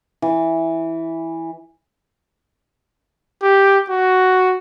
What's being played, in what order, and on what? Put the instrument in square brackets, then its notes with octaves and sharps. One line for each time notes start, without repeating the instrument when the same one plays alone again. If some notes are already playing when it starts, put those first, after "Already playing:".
[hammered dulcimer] E3
[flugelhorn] G4
F#4